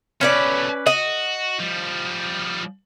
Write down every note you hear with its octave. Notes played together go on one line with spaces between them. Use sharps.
B2 A3 C#4 B4 D5
F#4 D#5
F3 G3